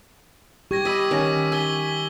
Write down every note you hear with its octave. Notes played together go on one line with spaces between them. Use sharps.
G4 C#6 G#6 A#6
D#5 B5 E6 B6 D#7
D#3 C#4 A#6 B6
G#5 E6 B6 G7